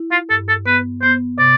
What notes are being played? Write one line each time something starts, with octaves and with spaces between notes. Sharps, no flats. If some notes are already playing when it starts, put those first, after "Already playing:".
Already playing: E4
F4
G2 A4
A4
B3 B4
B3 C5
C3 D5